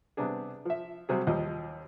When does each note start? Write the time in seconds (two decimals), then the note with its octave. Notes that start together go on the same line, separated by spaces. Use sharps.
0.17 C3 G3 B3 D4 G#4
0.65 F3 E5
1.09 C3 F#3 G3 C4 G#4
1.27 D#2 A#2 F3 G3 D#5